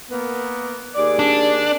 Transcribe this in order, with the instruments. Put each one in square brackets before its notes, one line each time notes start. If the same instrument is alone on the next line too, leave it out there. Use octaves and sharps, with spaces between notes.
[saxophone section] A#3 B3
D#2 G#4 D5
[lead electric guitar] D4